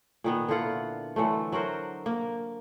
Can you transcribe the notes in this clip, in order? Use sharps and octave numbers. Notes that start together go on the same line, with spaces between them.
A#2 D#3 B3
D3 E4 F4 F#5
D3 E3 F#3 A3
F#3 F#4 A#4 C5
A#3